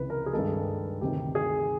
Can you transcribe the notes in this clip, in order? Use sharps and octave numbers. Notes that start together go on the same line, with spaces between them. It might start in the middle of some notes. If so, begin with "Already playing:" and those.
Already playing: C#2 C3 E3 B4
A#4
G#4
G2 D#3 G#3 A4
D2 C3 D#3 G4
G#4